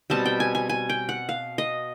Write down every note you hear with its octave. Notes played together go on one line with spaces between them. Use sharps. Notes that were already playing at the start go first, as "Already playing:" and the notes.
B2 G3 C4 A5
G5
G#5
G#5
G#5
G5
F#5
F5
D#5